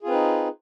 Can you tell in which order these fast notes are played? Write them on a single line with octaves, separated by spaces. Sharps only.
G#4 F4 C4 B4 D#4